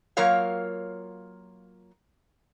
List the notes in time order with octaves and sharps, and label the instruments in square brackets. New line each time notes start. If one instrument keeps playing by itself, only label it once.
[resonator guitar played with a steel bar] F#3 A#3 F4 A#4 C#5 F5